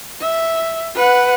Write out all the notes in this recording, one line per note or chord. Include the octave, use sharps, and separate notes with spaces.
E5
B4 F#5